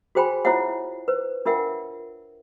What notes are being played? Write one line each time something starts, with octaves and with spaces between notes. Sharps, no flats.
F#4 G#4 C5 G5 G#5 B5
E4 F4 C5 C#5 E5 F#5
B4 C5
D4 F4 A#4 E5 F#5 G5